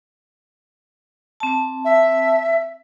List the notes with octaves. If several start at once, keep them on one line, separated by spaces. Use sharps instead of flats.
C4 A5
E5